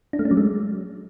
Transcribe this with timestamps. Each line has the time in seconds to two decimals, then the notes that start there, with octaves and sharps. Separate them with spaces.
0.13 D4
0.19 A3
0.25 C#4
0.31 F#3
0.37 G#3